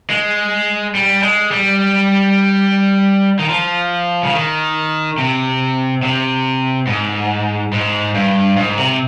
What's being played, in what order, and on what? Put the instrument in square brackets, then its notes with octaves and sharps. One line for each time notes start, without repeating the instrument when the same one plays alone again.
[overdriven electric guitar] G#3
G3
G#3
G3
D#3
F3
C#3
D#3
C3
C3
G#2
G#2
G2
G#2
C3